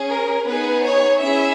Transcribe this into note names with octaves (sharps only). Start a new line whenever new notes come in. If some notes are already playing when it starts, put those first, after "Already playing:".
Already playing: C#4 G#4
A#4
B3 D#4 G#4 B4
C#5
C#4 E4 G#4 E5